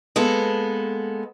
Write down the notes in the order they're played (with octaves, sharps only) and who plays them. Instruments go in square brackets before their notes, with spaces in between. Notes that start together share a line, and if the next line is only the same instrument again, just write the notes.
[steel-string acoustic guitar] G#3 A#3 B3 A4